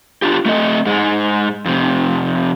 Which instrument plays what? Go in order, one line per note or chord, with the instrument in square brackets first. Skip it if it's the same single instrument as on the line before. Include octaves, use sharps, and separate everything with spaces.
[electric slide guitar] D4 F4 G4
A3 C4 A4 D#5
G#2 G#3
F2 C3